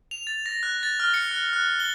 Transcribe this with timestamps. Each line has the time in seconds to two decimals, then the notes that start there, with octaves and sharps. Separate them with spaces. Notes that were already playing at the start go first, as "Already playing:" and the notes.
0.11 F7
0.27 A6
0.46 A#6
0.63 F#6
0.83 A6
1.00 F6
1.14 C#7
1.31 F#6
1.53 F#6
1.80 G7